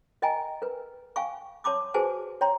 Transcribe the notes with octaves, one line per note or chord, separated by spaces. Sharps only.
A#4 D#5 E5 G5 G#5 A#5
A#4 B4
F5 G5 G#5 C#6
C#5 A5 C6 D6 D#6
F#4 G#4 B4 C5 G#5 A5
C#5 G5 A#5 C6